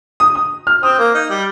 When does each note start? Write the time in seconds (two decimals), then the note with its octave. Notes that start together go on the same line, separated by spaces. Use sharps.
0.20 D#6
0.35 D#6
0.67 F6
0.83 C4 D#6
0.98 A#3
1.14 D#4
1.30 G3